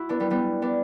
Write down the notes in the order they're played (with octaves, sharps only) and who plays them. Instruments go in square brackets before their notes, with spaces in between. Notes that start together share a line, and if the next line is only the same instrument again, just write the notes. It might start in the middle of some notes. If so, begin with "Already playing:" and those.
Already playing: [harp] E4 F#4
B3 D4
G3 B3
G3 B3
B3 D4